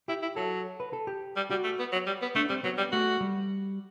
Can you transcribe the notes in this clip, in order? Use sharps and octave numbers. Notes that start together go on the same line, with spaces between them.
E4 G4
E4
F#3 A4
B4
A4
G4
G3
G3 F#4
A3
B3
F#3
G3
B3
A3 D4
G3 C4
F#3 B3
G3
A3 F#4
G3